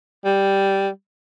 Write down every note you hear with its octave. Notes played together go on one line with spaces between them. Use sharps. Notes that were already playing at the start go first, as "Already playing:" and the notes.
G3